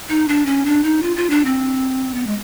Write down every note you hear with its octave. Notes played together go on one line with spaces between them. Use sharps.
D#4
D4
C#4
D4
D#4
F4
F4
D4
C4
B3
G#3